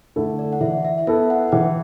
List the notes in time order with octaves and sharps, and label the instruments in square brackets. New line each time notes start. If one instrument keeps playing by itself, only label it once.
[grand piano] D3 A3 E4 A4
[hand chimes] D5
F#5
[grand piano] E3 [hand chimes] E5
[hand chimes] E5
[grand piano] B3 E4 A4 [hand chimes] E5
[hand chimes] F#5
[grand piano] E3 [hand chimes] G5